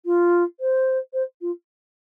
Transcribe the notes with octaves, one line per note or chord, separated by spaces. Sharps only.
F4
C5
C5
F4